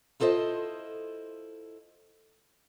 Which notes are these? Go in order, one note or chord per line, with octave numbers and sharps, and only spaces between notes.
E4 F4 A4 C5 D#5